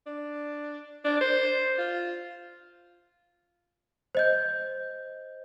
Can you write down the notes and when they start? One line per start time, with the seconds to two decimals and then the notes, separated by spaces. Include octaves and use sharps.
0.07 D4
1.05 D4
1.21 C5
1.79 F4
4.15 C5 D#5 G6